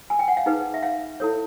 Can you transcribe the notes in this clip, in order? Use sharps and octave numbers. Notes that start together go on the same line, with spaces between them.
G#5
G5
F#5
F5
D#4 G#4 B4
E5
F5
E4 A4 C#5